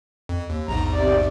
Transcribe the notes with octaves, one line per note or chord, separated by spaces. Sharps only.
F2
D#2
A#1 E2 G#2 A#5
C3 D5